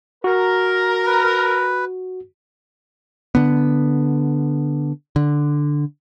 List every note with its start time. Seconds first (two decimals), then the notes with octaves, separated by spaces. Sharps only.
0.24 F#4 A#4
1.06 B4
3.35 D3 B3
5.16 D3